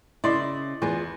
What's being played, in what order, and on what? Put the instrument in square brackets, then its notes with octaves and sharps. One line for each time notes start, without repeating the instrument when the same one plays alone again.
[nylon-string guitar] C#3 E4 [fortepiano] D5 D#5 C6
[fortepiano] E2 [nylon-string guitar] F4 G#4 B4